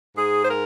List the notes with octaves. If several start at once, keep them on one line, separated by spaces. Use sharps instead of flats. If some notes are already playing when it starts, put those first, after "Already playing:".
G#2 G#4
C5
A#4